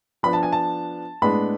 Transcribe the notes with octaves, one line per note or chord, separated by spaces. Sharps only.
F3 B3 D4 B5
A5
G#5
A5
A2 G#3 B3 D4 B5